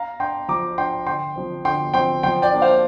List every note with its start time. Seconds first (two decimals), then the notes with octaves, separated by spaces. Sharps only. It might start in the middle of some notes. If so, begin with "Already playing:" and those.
Already playing: F5 A#5
0.20 D4 G5 C6
0.48 F3 A#5 D6
0.78 D4 G5 C6
1.06 D3 G5 C6
1.36 F3 C4
1.65 D3 G5 C6
1.94 F3 C4 G5 C6
2.23 F3 G5 C6
2.42 D5 G5
2.53 A#3 D4
2.62 C5 F5